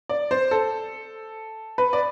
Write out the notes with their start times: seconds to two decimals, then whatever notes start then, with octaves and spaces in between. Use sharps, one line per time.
0.09 D5
0.31 C5
0.51 A4
1.78 B4
1.93 D5